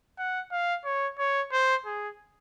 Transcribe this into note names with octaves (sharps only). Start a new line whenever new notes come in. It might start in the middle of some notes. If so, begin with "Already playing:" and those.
F#5
F5
C#5
C#5
C5
G#4